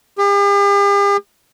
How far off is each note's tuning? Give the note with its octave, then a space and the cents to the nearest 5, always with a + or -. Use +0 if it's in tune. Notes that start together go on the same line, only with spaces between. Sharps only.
G4 +45